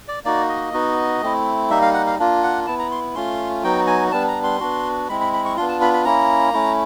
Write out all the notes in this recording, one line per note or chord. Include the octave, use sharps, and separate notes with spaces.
D5
A#3 D#4 F#4 D5
D#5
B3 D#4 F#4
A3 C4 E4
G3 A#3 D#4 E5
F5
F#5
F5
A#3 D4 F4
F#5
B3 E4 A5
A#5
C6
A3 C#4 F4 C6
F#3 B3 D#4 F#4 G5
G#5
G3 B3 D4 A5
A#5
C6
B3 D4 F#4
G#3 C4 E4 B5
B5
B5
C#6
B3 D4 F4 C6
A5
B5
B5
A#3 C#4 E4 A#5
A3 C#4 E4